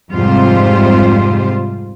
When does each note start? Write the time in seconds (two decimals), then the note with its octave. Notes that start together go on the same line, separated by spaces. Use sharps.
0.12 F2 G#2 C3 G3 F4 C5